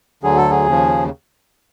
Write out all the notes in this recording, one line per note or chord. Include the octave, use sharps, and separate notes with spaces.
D2 D3 F#3 G#4
A4
G#4
D#2 C#3 F3